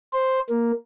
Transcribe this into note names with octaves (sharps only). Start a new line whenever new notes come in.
C5
A#3